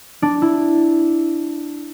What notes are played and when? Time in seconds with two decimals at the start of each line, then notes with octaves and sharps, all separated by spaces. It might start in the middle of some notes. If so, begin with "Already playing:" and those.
0.22 D4
0.42 E4